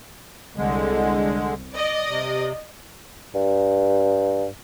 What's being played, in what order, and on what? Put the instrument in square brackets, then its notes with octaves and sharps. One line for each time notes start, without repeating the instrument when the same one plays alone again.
[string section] C2 [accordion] D3 G#3
[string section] D5 D#5
[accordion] C3
[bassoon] G2